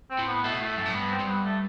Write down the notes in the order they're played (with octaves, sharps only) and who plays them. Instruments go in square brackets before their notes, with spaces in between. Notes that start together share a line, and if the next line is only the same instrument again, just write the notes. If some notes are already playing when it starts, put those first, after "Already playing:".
[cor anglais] C4
[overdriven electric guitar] A2
[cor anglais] B3
[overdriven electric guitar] B2 [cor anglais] A3
[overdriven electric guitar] A2 [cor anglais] A3
[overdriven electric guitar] F#2 [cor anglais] A3
[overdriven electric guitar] A2
[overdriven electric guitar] G2 [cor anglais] B3
[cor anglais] C4
[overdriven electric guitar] G2
[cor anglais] B3
A3